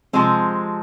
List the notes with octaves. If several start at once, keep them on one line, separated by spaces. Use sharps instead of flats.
C3 F3 G#3 C4